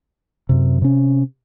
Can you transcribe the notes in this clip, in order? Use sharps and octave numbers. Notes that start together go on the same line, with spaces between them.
F#2 C3
C3 C#4